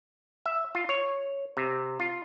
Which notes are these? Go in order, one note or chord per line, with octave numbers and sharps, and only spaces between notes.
E5
F4
C#5
C3
F4